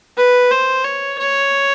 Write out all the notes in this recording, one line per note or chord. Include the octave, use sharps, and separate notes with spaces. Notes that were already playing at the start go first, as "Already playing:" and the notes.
B4
C5
C#5
C#5